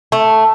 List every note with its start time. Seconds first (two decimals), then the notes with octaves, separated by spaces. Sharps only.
0.12 A3